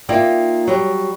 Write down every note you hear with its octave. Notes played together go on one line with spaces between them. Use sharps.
A#3 D#4 F4 D5 E5 G5
F#3 G3